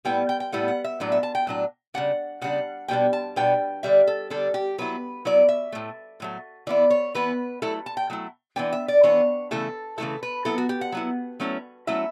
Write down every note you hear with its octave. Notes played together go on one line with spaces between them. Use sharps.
A2 G3 B3 E4 G5
G5
G5
A2 G3 B3 E4 F#5
F#5
E5
A2 F#3 B3 D4 D5
E5
A5
G5
A2 F#3 D4
C#3 G3 D4 F#5
C#3 G3 D4 F#5
B2 G3 B3 D4 G5
A5
B2 G3 B3 D4 G5
D3 G3 D4 E5
A4
D3 G3 D4 A4
G4
F#3 B3 E4 B4
F#3 B3 E4 D5
E5
A2 F#3 A3
A2 F#3 A3
E3 B3 E4 D5
C#5
E3 B3 E4 B4
F#3 A3 E4 A4
A5
G5
F#3 A3 E4
E3 B3 D4 G5
E5
D5
E3 B3 D4 C#5
C#3 E3 A3 E4 A4
C#3 E3 A3 E4 A4
B4
F#3 B3 E4 A4
F#4
G4
F#5
F#3 B3 E4
F#3 A3 C#4 E4
F#3 A3 C#4 E4 E5